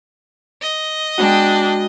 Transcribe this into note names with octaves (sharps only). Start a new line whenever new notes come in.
D#5
G#3 B3 D4 F#4 G5